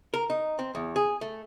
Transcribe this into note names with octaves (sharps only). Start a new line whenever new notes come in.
A#4
D#4
C4
E2
G#4
A3